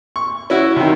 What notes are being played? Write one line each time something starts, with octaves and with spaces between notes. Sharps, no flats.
C#6
C#4 E4 F#4
C3 D#3